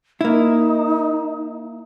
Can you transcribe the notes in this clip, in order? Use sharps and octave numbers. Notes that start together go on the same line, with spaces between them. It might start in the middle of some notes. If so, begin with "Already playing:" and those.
A#3 D#4 E4